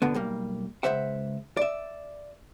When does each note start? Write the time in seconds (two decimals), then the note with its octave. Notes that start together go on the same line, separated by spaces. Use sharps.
0.02 G2 B2 D3 B3
0.14 B1 G3 A#3
0.83 C#2 E3 C5 E5 F#5
1.57 D5 E5